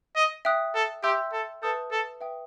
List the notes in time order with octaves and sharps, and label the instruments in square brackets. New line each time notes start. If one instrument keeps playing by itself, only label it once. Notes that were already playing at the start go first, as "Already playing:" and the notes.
[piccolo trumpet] D#5
[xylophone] E5 G5 D#6 F#6
[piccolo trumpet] A4
[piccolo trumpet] G4 [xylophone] E5 G5 C6 E6 G6
[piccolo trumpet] A4
[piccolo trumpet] A4 [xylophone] B4 E5 A5 D#6 G6
[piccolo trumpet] A4
[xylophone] B4 E5 G5 D#6